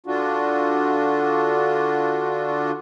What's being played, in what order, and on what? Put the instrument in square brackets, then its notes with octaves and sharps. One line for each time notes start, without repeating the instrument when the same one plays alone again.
[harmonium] D3 D4 F4 F#4